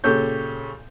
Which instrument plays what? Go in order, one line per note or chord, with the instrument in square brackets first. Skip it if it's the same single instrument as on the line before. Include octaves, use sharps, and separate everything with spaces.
[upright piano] A#2 C#3 G4 A4 C#5 G6